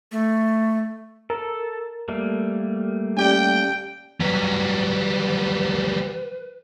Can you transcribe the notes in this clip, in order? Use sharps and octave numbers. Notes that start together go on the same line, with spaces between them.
A3
A4 A#4
G3 A3 A#3
C#4 G4 D5 G5
F#3 G3 B4